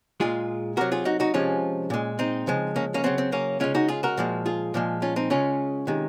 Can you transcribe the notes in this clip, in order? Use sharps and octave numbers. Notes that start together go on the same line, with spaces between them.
A#2 G#3 F4 G#4
C3 F#3 F#4 A#4
F4 G#4
D#4 F#4
D#4 F#4
C3 F3 G#3 C#4 F4
A#2 G#3
C4 D#4
C#3 F3 G#3
A#3 C#4
A#3 C#4
C#3 F#3 C4
C4
A#3 C#4
C#3 G#3 C#4 F4
D#4 F#4
F4 G#4
F#4 A#4
A#2 F3 G#3
F4 G#4
A#2 F3 G#3
C#4 F4
C4 D#4
C#3 G#3 C#4 F4
C3 D#3 G#3